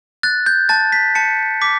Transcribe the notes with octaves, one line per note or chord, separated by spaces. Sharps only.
F#6 A6
G6
A5 A6
B6
A5 C#7
D6 B6